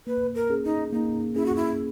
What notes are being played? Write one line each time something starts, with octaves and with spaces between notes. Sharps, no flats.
A#3 B4
A#4
C#4 G#4
D#4
A#3 D#4
C#4 E4 G#4
F#4
E4